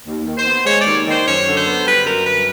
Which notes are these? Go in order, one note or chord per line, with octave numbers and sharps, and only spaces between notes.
D#2
D#3
C5
B3
G#3 C#5
D#2 D5
D#3
C5
F#2 C#5
D3
C5
B3
G3 B4
F#2 A#4
D3 B4